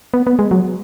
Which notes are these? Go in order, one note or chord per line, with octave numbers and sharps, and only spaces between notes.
B3
B3
G#3
F#3